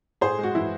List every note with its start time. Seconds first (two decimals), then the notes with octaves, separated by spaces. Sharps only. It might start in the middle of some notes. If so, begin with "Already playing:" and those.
0.21 A2 G#4 C5
0.39 G#3 F#4
0.55 E3 E4